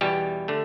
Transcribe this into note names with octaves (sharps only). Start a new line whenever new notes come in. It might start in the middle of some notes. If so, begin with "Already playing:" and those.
E2 B2 G3 G4
D3 A3